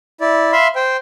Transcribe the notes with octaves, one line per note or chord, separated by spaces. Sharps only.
E4 D5
E5 F5 B5 C6
C5 G5